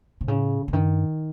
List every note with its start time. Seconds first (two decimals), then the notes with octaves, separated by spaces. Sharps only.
0.21 C3
0.27 A2 C#3
0.68 D3
0.73 G2 D#3